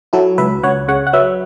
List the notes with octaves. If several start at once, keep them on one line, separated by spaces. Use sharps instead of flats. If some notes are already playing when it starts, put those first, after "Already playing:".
F#3 E4 A4
C#2 B4 E5
C#2 C#5 F#5
C#3 C#5 F#5
F#5
F#3 B4 E5